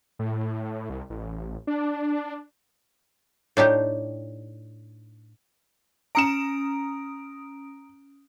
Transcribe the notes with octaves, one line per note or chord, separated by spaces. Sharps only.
A2
C2
A1
D4
A2 D4 D#4 G4
C#4 A#5 D#6 C#7 D7 E7